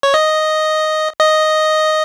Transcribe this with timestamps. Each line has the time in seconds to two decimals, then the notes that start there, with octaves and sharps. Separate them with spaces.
0.03 C#5
0.14 D#5
1.19 D#5